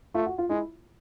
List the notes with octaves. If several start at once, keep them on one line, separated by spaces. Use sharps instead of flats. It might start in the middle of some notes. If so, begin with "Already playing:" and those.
A3 F4
F#4
F4
G#3 E4